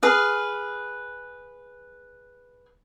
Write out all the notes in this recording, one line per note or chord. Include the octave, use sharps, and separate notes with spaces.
G#4 B4 F5